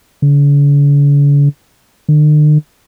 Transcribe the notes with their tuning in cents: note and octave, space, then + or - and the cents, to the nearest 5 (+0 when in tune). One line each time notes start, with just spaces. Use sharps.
D3 -45
D3 +45